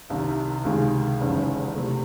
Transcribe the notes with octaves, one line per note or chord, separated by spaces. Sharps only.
C2 C3 D#3
C#2 C3 D#3 G#3
F#1 E2 D#3 G#3 C#4
C3 E3 A3